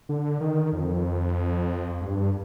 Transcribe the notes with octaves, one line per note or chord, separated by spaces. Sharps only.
D3
D#3
F2
G2